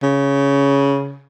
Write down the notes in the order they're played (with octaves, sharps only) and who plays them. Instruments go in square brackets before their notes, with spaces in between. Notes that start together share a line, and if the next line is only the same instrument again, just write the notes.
[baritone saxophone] C#3